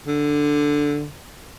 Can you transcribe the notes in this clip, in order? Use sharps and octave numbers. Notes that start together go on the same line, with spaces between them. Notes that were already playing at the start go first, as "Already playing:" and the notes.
D3